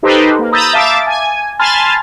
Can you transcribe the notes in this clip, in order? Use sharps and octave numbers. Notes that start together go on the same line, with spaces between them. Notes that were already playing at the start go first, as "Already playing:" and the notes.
D#4 G4 A4 B4 C5
A#3
A#5 B5 D#6 E6 G6 A6
E5 F5 A5 D6 A6
G#5
G#5 A5 B5 C6 F6 A6